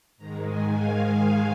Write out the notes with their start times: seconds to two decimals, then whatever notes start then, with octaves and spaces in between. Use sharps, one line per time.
0.18 G#2 D#3 G#3 A#5
0.45 G#5
0.75 F5